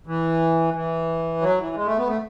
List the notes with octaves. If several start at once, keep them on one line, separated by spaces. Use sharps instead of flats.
E3
E3
F#3
E3
G#3
A3
B3
A3